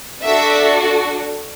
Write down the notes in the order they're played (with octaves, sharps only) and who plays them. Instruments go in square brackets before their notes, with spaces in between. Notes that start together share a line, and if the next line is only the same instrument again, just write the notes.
[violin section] D4 F#4 A4 E5